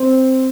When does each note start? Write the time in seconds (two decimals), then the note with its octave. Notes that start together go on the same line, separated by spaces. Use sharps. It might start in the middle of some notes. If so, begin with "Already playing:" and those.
Already playing: C4